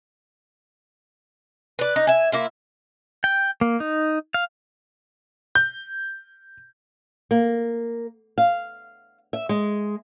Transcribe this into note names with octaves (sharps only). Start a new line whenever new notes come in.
B4 D5
D#4
E5 G#5
A#3 E4 F4
G5
A#3
D#4
F5
G6
A#3
F5
E5
G#3